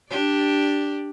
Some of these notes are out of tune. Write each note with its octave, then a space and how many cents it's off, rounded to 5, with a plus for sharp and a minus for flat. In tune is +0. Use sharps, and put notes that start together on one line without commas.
D4 +0 G4 +0 D5 +0